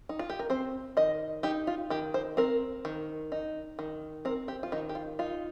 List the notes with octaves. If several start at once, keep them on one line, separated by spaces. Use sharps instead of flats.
D#4
F4
G4
A#4
C4 C5
D#3 D#5
D#4 G4
F4
D#3 G4
C5
C4 A#4
D#3
D#4
D#3
C4 A#4
G4
F4
D#3 D#4
G4
F4
D#4 F4